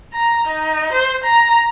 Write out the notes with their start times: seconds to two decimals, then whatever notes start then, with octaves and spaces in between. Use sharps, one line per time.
0.14 A#5
0.48 D#4
0.92 C5
1.24 A#5